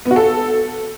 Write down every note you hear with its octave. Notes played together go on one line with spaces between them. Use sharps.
B3
F#4
A4